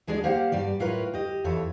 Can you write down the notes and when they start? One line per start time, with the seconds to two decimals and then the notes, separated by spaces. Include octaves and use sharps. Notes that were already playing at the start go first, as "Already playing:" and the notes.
0.07 D2 G#3 D4 G#4 D5
0.24 A#3 G4 C5 F5 F#5
0.52 G2 G3 D5
0.80 A2 F4 A#4 B4 C#5
1.14 G4 D#5
1.44 F2 E3 A4 C#5